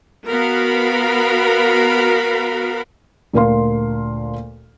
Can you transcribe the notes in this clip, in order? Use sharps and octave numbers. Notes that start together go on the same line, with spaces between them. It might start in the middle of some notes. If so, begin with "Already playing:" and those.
B3 F#4 A#4 F5 B5
D2 A#2 A#3 A#4 F5 C6